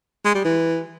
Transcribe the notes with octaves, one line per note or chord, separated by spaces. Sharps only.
G#3
G3
E3